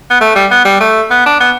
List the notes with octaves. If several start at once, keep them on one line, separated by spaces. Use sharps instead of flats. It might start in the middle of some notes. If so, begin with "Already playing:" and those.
B3
A3
G3
B3
G3
A3
B3
D4
B3